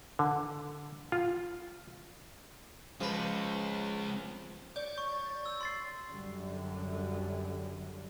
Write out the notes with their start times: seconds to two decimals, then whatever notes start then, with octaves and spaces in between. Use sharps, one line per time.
0.19 D3
1.12 F4
3.01 F3 G#3 C#4 B4
4.76 C#5 D5 G6
4.98 C#6
5.46 E6
5.61 C6 A6 C7
6.10 F#2 D3 G3